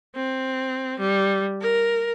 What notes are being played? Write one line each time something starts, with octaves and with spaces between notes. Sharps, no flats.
C4
G3
A#4